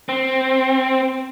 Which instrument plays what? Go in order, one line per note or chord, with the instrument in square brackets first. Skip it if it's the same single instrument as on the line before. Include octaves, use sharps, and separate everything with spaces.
[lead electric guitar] C4